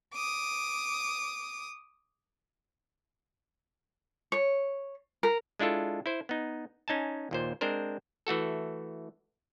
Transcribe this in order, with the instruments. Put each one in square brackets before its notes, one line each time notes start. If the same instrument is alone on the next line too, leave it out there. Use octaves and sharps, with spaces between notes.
[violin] D6 D#6
[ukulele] C#5
A#4
[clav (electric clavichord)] G#3 D4 E4 F4 A4
E4 C5
B3 D#4
C#4 D#4 G#5 A5
D#2 A#2 C5
G#3 C4 D4 A#4 C5
E3 A3 F#4 A4